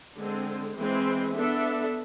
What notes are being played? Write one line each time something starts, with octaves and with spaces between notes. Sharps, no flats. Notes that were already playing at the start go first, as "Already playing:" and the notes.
D3 G#3 C4
E3 G#3 C4
B3 D4 A4 E5